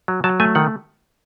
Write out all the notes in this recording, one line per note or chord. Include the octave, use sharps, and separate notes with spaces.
F#3
F#3 A5
A3 G#5
D#3 F#5